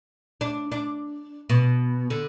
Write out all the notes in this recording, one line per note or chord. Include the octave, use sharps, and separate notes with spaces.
D4
D4
B2
D3